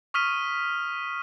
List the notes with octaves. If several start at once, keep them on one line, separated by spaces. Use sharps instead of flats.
C#6 D#6 F6 B6 D#7